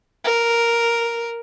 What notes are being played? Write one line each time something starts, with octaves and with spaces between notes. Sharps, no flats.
A#4